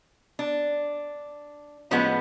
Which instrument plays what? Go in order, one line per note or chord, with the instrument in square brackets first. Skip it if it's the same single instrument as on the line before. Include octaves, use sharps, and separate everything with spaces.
[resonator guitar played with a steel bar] D4
A2 F3 G#3 B3 C#4